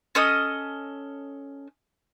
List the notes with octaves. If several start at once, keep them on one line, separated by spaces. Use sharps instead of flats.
C#4 A4 D#5 D#6